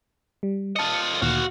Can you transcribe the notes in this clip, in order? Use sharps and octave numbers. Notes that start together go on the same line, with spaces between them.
G3
F4 D#5 A5 C#7
D2 A#2 D#3 F#4 F5